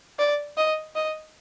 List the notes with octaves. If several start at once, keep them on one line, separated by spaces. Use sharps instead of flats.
D5
D#5
D#5